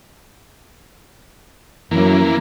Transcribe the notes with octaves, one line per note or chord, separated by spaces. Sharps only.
F#2 E3 A#3